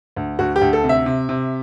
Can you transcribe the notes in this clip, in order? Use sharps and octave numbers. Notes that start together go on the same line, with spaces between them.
D2
D2 F#4
G4
D2
A4
C3
E5
C3
C3